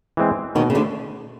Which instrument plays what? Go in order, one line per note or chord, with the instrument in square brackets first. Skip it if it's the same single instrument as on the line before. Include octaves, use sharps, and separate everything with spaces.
[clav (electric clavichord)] E3 G#3 C4
[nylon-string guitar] D#2 D#3 [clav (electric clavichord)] B2
[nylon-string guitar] C#3
D2 D3